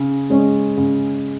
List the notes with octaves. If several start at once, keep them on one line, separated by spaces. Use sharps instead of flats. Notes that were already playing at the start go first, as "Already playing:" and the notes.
Already playing: C#3
G#3 C#4
C#3